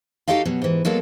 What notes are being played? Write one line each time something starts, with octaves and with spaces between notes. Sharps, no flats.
D#4 F#4 G4 A4 D#5 F5
B2 F#3
G#2 E3
F#3 G#3 A#3 B3 A4